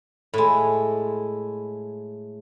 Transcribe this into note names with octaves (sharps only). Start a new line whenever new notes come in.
A2 G#3